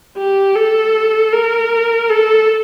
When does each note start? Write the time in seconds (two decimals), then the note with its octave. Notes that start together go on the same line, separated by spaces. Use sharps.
0.17 G4
0.56 A4
1.33 A#4
2.10 A4